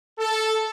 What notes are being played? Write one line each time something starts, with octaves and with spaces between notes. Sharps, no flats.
A4